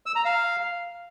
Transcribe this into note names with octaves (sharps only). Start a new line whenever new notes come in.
E6
A#5
F5